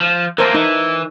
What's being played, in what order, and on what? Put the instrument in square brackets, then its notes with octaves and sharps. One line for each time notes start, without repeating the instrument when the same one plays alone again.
[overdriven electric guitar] F3
[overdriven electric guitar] E3 A#3 [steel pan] A#4 C5 A5
[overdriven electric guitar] E3 [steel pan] D#4